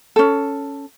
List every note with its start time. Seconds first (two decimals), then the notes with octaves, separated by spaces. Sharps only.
0.16 C#4 A4